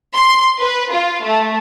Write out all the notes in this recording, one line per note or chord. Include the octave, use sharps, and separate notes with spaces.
C6
B4
F4
A3